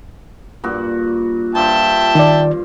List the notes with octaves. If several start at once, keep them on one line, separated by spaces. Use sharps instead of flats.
G2 A#2 F#4
G2 F4 C5 E5 G5 A5
D#3 D5